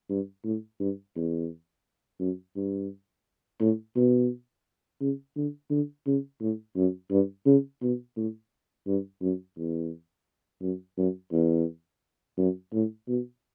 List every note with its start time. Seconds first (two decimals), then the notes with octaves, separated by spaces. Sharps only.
0.10 G2
0.44 A2
0.80 G2
1.15 E2
2.20 F#2
2.56 G2
3.60 A2
3.96 B2
5.01 C#3
5.36 D3
5.70 D3
6.06 C#3
6.41 A2
6.76 F#2
7.11 G2
7.46 C#3
7.82 B2
8.16 A2
8.87 G2
9.22 F#2
9.57 E2
10.62 F#2
10.98 F#2
11.32 E2
12.38 F#2
12.73 A2
13.08 B2